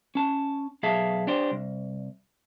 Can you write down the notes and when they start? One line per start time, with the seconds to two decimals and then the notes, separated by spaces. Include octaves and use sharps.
0.15 C#4 A5
0.83 B1 G#4 E5 F5 A5
1.27 D4 G4 C5
1.51 C2